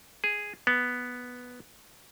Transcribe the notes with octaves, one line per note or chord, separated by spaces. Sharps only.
G#4
B3